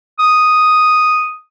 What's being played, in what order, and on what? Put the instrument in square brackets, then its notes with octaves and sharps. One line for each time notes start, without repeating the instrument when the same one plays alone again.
[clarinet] D#6